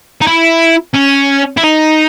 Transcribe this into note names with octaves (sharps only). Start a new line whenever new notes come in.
D#4
E4
C#4
E4
D#4